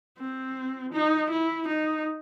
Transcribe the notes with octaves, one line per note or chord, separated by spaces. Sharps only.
C4
D#4
E4
D#4